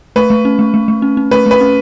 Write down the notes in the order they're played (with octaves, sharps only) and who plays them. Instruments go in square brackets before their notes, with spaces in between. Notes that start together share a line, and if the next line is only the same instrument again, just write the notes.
[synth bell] A3 [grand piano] B4
[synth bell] A3
C#4
A3
A3
A3
C#4
C#4
[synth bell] A3 [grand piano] B4
[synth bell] A3 [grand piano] B4
[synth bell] C#4